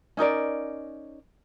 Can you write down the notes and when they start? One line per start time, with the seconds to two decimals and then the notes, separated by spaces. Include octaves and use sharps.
0.17 C#4 D#4 A#4 D5